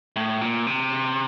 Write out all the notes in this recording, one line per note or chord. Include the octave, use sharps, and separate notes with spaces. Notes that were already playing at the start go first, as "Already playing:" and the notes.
A2
A#2
C3